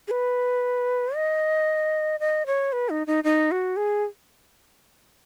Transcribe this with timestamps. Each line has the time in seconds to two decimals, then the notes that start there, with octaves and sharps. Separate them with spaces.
0.08 G#4
0.11 B4
1.16 D#5
2.20 D#5
2.46 C#5
2.73 B4
2.89 D#4
3.07 D#4
3.24 D#4
3.51 F#4
3.77 G#4